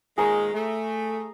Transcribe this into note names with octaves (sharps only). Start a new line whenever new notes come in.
A#2 D#3 G#3 G#4 A#5 C#6
A3